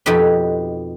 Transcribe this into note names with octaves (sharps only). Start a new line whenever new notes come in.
F2 B2 D#4 G4 B4